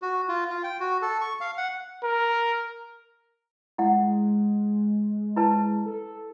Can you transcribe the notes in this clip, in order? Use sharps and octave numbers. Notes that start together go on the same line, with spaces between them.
F#4
F4
F4
G5
F#4
A4
C#6
F5
F#5
A#4
G#3 E4 F#5
G#3
E4 B4 A5
A4